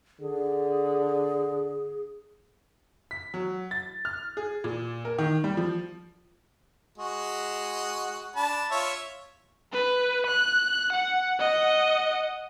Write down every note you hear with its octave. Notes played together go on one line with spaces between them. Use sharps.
D3 G#4
B6
F#3
A6
F6
G#4
A#2
A#4
D#3
G3
F3
G#3 F#4
D4 A5 B5
F4 C#5 E5
B4
F#6
F#5
D#5 F#5